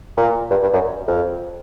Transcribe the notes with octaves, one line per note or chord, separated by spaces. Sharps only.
A#2
G2
G2
F#2
F2